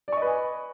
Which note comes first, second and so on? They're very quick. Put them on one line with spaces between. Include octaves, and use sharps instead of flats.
D5 C#6 D#5 B4 G#5